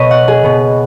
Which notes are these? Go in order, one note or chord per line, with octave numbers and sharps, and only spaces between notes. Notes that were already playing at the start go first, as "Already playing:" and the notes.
Already playing: B2 B3 B4 C#5 D#5
F#5
G#4
B2 B3